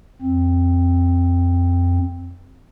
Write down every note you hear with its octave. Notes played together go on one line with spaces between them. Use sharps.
F2 C4